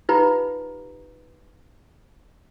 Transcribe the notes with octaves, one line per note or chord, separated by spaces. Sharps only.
D#4 F4 G4 B4 F5 A#5